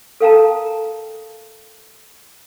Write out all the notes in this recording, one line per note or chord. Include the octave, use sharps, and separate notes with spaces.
A4 A#4 F5 G5 A5 A#5